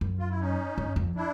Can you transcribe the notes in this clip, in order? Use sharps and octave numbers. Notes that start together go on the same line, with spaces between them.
F#2
F4
E4
C#4 D#4
G2
F2
D4 E4